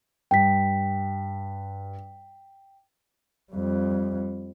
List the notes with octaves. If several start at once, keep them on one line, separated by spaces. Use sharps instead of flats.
G2 G5 B6
F2 G3